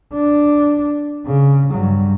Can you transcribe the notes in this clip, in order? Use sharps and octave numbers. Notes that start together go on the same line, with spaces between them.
D4
C#3
G2 F#3